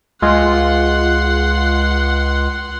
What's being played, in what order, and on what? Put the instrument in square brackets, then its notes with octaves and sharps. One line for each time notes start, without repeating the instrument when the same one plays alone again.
[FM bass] C#2 [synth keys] G#3 F4 [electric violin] F#5 C6